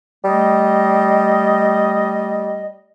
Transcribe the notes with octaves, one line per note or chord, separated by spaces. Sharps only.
G3 A3 D#5